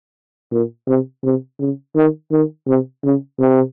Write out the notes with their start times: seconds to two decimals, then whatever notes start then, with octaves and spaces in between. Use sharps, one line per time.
0.51 A#2
0.87 C3
1.23 C3
1.59 C#3
1.95 D#3
2.31 D#3
2.67 C3
3.03 C#3
3.39 C3